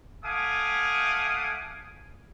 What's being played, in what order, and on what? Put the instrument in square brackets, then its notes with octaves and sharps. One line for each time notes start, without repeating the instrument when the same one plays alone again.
[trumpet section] A3 F5 F#5 G#5 D6 D#6